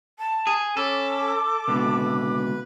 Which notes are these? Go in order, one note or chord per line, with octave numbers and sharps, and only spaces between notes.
A5
G#4
C#4 A4 B5 D6
C#2 B2 D3 B4